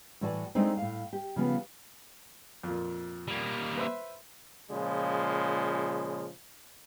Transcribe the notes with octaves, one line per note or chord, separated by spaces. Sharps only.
A2 E3 F#4 D5 A5
G#3 A3 C4 D4 D#4
A2 F5
G4
C#3 F3 B3
F2 A#2
G3 A#3
B4 C5 E5
A#2 C#3 F3 G#3